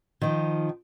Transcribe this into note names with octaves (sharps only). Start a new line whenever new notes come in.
D#3 F3